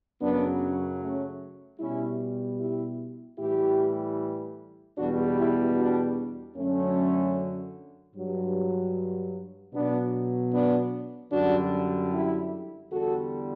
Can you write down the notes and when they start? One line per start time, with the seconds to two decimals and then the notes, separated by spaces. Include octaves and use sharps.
0.21 F#2 C#3 F#3 B3 D4
1.00 A3 C#4
1.79 B2 G3 C#4 E4
2.59 E4 G4
3.38 A2 E3 G3 E4 G4
4.97 E2 B2 G3 D4 F#4
5.37 E4 G4
5.76 D4 F#4
6.56 F#2 D3 F#3 A3 C#4
8.14 G2 F#3
9.73 B2 F#3 B3 D4
10.52 B3 D4
11.32 F#2 D3 G3 D4 F#4
12.11 E4 G4
12.90 E2 D3 G3 F#4 A4